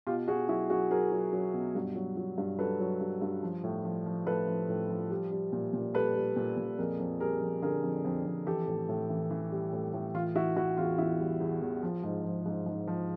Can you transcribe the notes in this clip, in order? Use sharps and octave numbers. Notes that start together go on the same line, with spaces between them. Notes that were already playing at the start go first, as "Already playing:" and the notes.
B2 F4 G4
B2 F#4 G#4
F#3 E4 F#4
F#3 F#4 G#4
F#3 G#4 A#4
F#3
F#3
B2
G2
F#3
F#3
G2
F#3 A4 B4
F#3
G2
G2
F3
A2
F3
F3
A2 A4 B4
F3
A2
F3
G3
G3
A#2
A#2
G3 A4 B4
G3
A#2
A#2
F2 G#4 A#4
F2
G3 G#4 A#4
F2
D3 G#4 A#4
F2
F2
F2
E3 G4 A4
A2
A2
E3
E3
G3
A2
A2
E3 F4
E3 E4 F#4
E3 E4 F#4
E2 F4
E2 E4
G3
E2
E2
F3
G#2
F3
G#2
G#2
F3